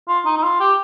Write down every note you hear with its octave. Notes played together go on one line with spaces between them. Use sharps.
F4
D#4
D#4
F4
G4